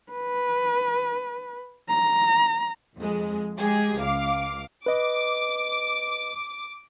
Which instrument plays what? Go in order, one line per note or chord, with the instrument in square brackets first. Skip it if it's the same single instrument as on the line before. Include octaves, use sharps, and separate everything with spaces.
[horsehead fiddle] B4
A#5
[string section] F2 G#3
G#3 G4 G#4
C#2 F5 D6
[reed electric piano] B4 D#5 [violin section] D6